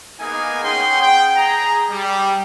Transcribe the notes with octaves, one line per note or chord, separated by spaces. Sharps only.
A#3 B3 D#4 G#4 G#5
C#4 G#4 F#5 G5 C6
G5
G#4 A#5
G3